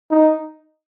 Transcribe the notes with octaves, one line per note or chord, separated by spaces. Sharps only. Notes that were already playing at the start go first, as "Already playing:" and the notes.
D#4